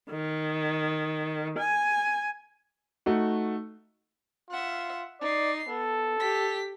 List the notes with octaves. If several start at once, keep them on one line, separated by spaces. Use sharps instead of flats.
D#3
G#5
A3 D#4 F#4
F4 E5 F#5
D#4 D5 C7
B3 A4
G4 B6